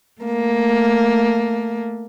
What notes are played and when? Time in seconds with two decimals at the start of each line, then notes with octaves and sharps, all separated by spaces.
0.22 A3 A#3